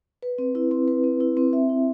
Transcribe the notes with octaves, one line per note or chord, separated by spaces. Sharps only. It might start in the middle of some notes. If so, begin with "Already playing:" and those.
B4
C4
E4
C4
B4
C4
E4
C4
E5
E4